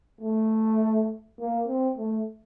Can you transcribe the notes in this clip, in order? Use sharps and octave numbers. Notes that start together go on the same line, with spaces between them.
A3
A#3
C4
A3